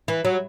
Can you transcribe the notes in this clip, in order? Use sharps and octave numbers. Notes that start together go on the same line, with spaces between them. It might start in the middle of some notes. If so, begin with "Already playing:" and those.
E3
F#3